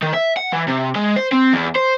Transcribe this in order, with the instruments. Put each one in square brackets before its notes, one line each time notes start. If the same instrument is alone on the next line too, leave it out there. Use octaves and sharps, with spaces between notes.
[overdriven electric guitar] D#3
E5
F#5
E3
C3
G#3
C5
C4
E2
C5